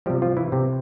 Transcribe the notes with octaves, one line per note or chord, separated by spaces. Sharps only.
C3 F3 G3 G4
F3 F4
E3 E4
C3 C4